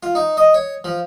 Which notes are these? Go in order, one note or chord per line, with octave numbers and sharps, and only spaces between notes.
F4
D#4
D#5
C#5
F3